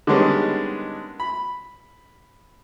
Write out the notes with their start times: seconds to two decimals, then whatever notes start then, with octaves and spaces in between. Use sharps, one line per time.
0.07 D3 D#3 G3 G#3 B3 C#4
1.20 B5